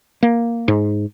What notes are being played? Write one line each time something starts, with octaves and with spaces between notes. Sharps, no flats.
A#3
G#2